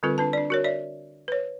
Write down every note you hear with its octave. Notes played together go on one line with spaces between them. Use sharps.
D3 G3 C4 F4 A4 B4
D4 B4 A5
D4 D5
F#4 A#4 C#5
C#5 D5 E5
B4 C#5